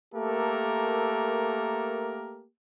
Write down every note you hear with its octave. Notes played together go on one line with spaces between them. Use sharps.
A3 A#3 G4 A4 A#4